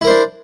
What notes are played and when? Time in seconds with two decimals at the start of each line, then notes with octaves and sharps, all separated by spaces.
0.01 E4
0.04 A#4
0.07 C5
0.10 D4